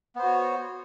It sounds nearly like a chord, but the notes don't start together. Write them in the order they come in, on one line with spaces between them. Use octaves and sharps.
B3 C5 F#4 C#5